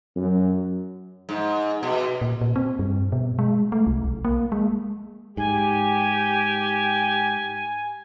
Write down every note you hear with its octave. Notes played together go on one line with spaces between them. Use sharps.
F#2
G#2
B2
A#2
A#2
C4
G2
B2
G#3
A3
C2
B1
A#3
G#3
G#2 G4 G#5